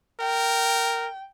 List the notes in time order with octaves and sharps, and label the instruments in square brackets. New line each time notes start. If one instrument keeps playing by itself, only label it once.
[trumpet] A#4 [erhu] G5